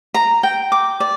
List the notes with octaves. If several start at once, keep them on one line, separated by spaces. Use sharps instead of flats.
A#5
G5
D6
D5